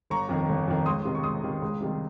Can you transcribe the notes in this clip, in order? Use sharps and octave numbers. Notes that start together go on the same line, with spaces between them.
G1 A#5 C#6
F2 D#3
G1
F2 D#3
C#2 C6 D#6
C3 D#3
C#6
C#2 C6 D#6
C3 D#3
C#2
C3 D#3 G3